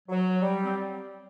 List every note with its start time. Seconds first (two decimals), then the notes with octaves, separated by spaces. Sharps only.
0.09 F#3
0.41 G3
0.65 C4